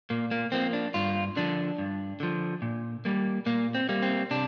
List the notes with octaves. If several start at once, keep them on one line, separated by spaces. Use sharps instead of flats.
A#2 A#3
A#3
F3 A#3 C4
D4
G2 F4
D3 F3 D4
G2
D3 F3
A#2
G3 A#3
A#2 A#3
C4
G3 A#3
C4
C3 D4